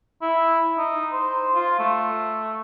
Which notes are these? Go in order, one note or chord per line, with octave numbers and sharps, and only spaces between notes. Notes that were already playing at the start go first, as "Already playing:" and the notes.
E4
D#4
C5
F4
A3